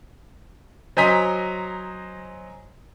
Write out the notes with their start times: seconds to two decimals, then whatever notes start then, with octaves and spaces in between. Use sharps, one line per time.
0.97 F#3 C5 D#5 G#5 A#5 B6